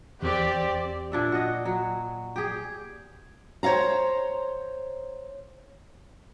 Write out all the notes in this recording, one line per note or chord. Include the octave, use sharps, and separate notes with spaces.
E2 C4 G4 D5
A#2 D4 E5
F#4 D#5
F#3
G4 G#4
C5 C#5 D#5 F5 A#5